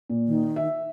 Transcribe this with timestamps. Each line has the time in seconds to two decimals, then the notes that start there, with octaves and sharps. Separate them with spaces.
0.10 A#2
0.27 D#3
0.56 E5